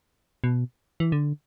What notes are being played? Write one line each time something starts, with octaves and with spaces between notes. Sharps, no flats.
B2
E3
D3